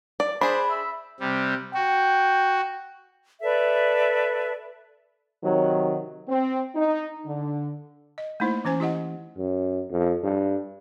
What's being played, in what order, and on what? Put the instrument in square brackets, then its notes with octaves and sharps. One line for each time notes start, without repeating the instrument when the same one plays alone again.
[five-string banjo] D5
[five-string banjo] D4 G#4 [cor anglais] C5 [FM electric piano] B5
[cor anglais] E5
[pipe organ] C3 G3
[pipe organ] F#4 [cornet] G5
[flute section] A4 B4 D5 E5
[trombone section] C3 D#3 F#3
[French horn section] C4
D#4
D3
[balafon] D#5
A3 A#3 D#4 E4 C5
E3 C#4 C5 G#5
E4 G4 D#5 F#5
[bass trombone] F#2
F2
G2